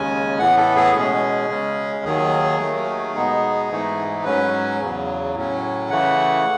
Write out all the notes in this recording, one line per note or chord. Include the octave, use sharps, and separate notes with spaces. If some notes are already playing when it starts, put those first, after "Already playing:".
Already playing: D#2 C#3 G#3 C#4 G#5
A2 E3 B3 F#5
A4
G#4
B2 G#3 C#4
C#3 G#3 C#4
D#2 D#3 F#3 G#4
D#2 D#3 F#3 A3
B2 G#3 B3 D#4
G#2 E3 A3 D#4
G#2 F#3 C#4 B4
E2 C#3 F#3
A2 F#3 C#4
C#3 E3 A3 F#5